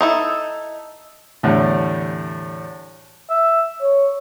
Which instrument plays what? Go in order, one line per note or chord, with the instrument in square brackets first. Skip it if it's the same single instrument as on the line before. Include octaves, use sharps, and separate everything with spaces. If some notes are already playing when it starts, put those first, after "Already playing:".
[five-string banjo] D#4 E4 A4
[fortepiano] E2 A2 D3 G3 A3
[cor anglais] E5
C#5